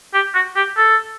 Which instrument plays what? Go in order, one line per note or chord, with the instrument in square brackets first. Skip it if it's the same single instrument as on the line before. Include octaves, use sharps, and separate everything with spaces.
[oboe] G4
F#4
G4
A4